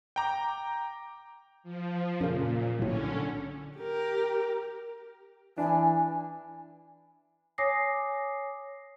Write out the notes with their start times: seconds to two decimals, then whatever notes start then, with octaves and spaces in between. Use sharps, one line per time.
0.16 G5 A#5 D6
1.63 F3
2.21 F#2 A#2 C#3
2.79 B1 A2 D3 C#4
3.78 G4 A#4
5.58 E3 D4 G#5
7.58 C#5 G#5 D6 D#6 A#6 C7